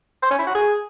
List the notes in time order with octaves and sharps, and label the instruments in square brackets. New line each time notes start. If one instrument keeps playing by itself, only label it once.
[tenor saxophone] C5
C#4
E4
F#4
G#4